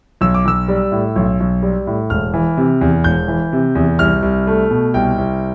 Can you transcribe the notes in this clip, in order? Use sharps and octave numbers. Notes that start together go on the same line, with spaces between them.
B1 E6
D6
B1 E6
G3
A2
B1
B1
G3
A2
E1 F6
E3
C3
E2
E1 G6
E3
C3
E2
C2 F6
C2
A3
B2
C2 G5
C2